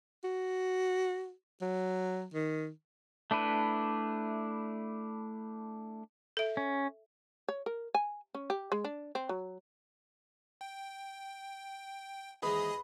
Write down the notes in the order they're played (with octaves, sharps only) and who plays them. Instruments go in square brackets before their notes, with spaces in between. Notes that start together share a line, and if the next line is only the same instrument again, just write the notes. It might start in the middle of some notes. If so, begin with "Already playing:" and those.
[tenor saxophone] F#4
F#3
D#3
[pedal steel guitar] A3 D4 E4 B4
[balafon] A4 E5
[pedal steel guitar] C#4
[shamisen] C#5
A#4
G#5
C#4
G4
G#3
D4
C4
F#3
[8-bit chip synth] G5
[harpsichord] D#2 G#2 E3 [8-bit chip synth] G#4 D#5 D#6 [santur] B4